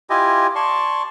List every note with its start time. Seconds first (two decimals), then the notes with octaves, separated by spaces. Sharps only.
0.10 E4 F4 G4 D#5 G#5
0.55 D5 A5 C6 C#6